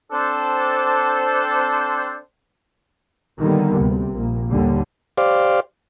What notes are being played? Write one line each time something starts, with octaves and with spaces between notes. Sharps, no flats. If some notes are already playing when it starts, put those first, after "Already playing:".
C4 D4 A4 C5
D3 D#3 G3 A#3 B3
D2 C3
A#1 A#3
D#2 D3 G3
G4 C5 D5 F5